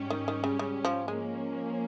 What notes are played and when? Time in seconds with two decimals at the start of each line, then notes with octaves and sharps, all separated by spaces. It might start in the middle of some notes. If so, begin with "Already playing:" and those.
Already playing: G#2 G3 C#4 G4
0.10 D#3
0.28 D#3
0.44 C#3
0.59 C#3
0.85 F3
1.08 F3 G#3 A#3 C#4